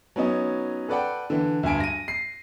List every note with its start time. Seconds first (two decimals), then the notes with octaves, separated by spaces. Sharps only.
0.16 F#3 B3 C#4 D#4
0.88 A4 B4 D5 F#5 G5
1.30 D3 E3
1.63 D2 G2 G#5 D7
1.80 A#6 D#7
2.08 C7